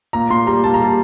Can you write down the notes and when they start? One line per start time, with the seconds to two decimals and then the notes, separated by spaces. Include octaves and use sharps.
0.13 A#2 A#5
0.30 A#2 C6
0.47 G3 A#5
0.64 A#2 A5
0.74 A#5
0.81 G3 A5